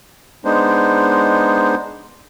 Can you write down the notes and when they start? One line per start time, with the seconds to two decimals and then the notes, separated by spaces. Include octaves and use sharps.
0.45 G#3 B3 D4 D#4 C5